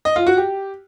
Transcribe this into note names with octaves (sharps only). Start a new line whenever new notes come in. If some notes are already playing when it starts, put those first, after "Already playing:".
D#5
F4
F#4
G4